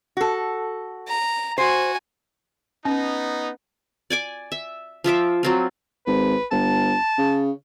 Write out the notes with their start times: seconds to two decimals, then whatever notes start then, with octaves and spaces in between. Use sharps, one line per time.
0.17 F#4 A4
1.08 A#5
1.58 F#4 C5 G#5
2.85 B3 C#4 D#4
4.10 D5 G#5 D6
4.52 E5
5.04 F3 F4 E5 D6
5.43 F#3 C4 F4
6.07 G#1 B4
6.52 G1 A5
7.18 C#3